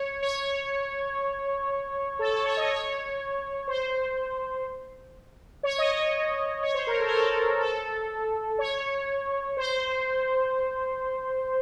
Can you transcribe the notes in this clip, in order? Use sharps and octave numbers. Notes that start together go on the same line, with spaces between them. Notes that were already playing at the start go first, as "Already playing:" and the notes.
Already playing: C#5
C#5
A4
A4
C#5
D#5
C#5
C5
C#5
D#5
C#5
C#5
C5
A#4
A4
A#4
A4
A4
C#5
C5